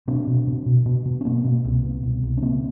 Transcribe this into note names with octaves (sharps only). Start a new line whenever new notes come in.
B2 C4 D4
B2
B2
B2
B2
B2
C#4
B2 A#3 C4
B2
C2
B2
C2
C2
C#4
C#3 A#3 C4